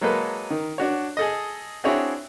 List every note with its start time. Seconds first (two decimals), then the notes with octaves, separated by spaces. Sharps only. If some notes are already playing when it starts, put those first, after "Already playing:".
0.01 F#3 G#3 A#3 A4 B4
0.50 D#3
0.78 D4 F#4 C#5
1.17 G#4 A4 D#5
1.84 C4 D4 E4 F#4 G#4 C#5